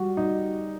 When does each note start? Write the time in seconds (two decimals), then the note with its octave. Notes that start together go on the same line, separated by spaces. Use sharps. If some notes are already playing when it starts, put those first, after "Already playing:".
Already playing: G3 F#4
0.17 D#4